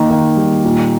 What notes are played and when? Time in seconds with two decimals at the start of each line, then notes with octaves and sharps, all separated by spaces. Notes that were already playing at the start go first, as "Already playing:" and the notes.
Already playing: D#3 A#3
0.10 D#3
0.37 G3
0.64 A#2